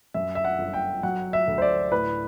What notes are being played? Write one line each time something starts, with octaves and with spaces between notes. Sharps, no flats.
F#2 E5
E5
F#5
G1
G5
F#3 F#5
E5
D2
C5
D5
A2 B4